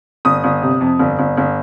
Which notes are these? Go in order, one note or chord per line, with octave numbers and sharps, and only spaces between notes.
G1 D#6
G1
C3
F2
G1
G1
G1